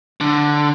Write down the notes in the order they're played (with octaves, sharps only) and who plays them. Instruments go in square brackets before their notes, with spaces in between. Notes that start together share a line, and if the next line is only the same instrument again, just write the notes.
[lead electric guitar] D3